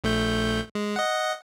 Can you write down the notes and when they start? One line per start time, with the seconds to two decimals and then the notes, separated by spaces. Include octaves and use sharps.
0.04 A#1 A3 G6
0.75 G#3
0.96 D#5 F#5